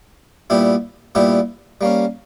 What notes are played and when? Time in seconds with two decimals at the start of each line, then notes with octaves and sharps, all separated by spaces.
0.50 A#2 G3 B3 E4 G4
1.15 A#2 G3 B3 E4 G4
1.81 G3 A#3 C#4